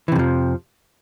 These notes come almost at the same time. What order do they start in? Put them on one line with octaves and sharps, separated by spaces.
E3 C3 F2 F3